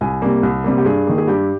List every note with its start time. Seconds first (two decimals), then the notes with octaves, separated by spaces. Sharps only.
0.01 C2 G#5
0.22 C3 G3 A#3
0.43 C2
0.64 C3 G3 A#3
0.78 G4
0.85 G2 G#4
1.07 D#3 A#3
1.18 G#4
1.27 G2 G4